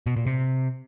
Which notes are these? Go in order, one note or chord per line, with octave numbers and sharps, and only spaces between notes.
B2
A#2
C3